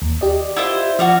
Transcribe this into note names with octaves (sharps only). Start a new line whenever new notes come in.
D#2
G4 D5 D#5
E4 F4 C5
F3 F#4 D5 F5